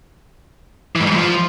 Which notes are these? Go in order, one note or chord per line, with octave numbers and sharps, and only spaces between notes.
E3
G#2
G2
G#2
F3